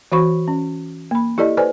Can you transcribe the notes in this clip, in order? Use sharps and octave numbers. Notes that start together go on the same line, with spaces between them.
E3 F#4 C5 B5 C#6
C#4
A#3 B5
E4 G4 A4 D5 D#5
A4 B4 C5 D5 G#5